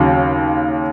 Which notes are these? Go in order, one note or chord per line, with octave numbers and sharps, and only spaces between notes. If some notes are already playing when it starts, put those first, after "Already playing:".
Already playing: D#2 C#3 F#3